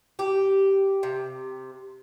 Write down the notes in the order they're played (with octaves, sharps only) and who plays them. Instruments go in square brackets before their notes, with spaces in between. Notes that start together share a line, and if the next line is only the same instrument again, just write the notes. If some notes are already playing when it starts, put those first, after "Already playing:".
[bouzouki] G4
C3